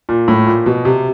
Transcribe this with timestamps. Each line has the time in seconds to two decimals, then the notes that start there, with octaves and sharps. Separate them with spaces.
0.09 A#2
0.28 A2
0.47 A#2
0.66 B2
0.85 C3